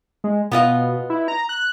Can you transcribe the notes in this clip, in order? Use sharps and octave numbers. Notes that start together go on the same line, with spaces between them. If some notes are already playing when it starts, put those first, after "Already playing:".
G#3
B2 B3 F4 D#5
E4
A#5
F#6